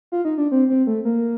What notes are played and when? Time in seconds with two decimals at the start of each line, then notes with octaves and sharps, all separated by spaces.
0.12 F4
0.25 D#4
0.38 D4
0.52 C4
0.70 C4
0.87 A3
1.05 A#3